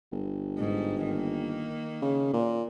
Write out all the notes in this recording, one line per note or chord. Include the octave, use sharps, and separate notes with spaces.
G1
G#2
D#3 A#3
C#3
A#2